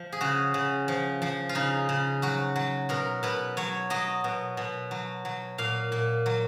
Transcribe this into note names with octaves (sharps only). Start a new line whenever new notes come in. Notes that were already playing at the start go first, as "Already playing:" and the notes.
Already playing: F3
G#4
C#3 F#4
C#3
F3
F3
F4
C#3 D#4
C#3
F#3 F#4
F#3
B2 A#4
B2 B4
F#3 C#5
F#3 D#5
B2
B2
F#3
F#3
A#2 F5
A#2
F#3